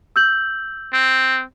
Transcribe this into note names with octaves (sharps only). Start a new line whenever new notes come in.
E6 G6 F#7
C4